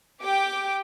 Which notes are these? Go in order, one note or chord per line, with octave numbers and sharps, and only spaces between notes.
G4 G5 D6